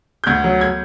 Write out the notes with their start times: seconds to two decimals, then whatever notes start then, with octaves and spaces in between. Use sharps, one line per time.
0.24 G6
0.27 D2 G#6
0.44 F#3
0.61 G#6